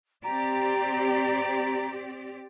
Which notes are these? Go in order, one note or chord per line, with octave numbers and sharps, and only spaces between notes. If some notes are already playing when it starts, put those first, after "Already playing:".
C4 G4 D5 A#5